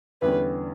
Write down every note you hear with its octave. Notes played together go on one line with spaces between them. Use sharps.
E2 D3 G3 C#4 G4 B4